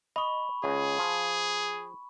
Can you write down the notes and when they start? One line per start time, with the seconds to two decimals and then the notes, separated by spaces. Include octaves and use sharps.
0.16 D#5 B5 C#6
0.64 C#2 G#4
0.98 F3